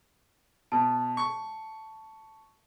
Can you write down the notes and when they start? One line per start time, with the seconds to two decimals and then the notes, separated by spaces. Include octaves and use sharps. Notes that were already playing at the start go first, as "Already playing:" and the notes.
0.72 B2 A5
1.17 C#6